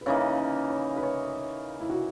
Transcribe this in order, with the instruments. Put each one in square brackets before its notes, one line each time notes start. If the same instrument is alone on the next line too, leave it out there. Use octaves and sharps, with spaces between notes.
[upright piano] B4
[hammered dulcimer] C#3 E3 A#3 D#4 [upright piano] C#5
[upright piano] C#5
C#5
B4
C#5
E4
F#4